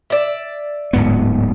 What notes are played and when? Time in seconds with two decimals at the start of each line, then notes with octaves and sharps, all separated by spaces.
0.10 D5 E5
0.93 D1 G#2 B3